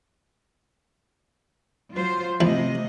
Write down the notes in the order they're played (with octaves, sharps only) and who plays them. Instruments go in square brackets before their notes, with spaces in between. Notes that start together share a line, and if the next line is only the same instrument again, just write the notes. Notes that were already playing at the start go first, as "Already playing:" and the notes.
[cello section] F#3 F4 C5
[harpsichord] E2 F3 [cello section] C3 A3 D#5